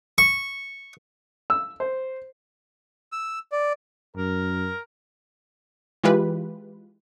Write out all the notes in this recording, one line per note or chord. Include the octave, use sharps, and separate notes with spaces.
C#6
E6
C5
E6
D5
F#2 A#4
E3 G#3 F4 G4 B4